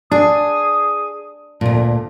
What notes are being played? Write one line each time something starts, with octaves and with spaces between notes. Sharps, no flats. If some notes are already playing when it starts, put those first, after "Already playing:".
D4 G#4 D#6
D2 A#2 A5